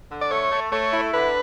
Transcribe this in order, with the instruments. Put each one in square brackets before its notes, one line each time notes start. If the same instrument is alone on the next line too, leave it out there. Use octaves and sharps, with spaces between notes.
[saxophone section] D3
[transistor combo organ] D5
[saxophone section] A3 [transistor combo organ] C#5
[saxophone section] A3
[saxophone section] A3 [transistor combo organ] C#5
[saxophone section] E4
[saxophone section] D3 [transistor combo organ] B4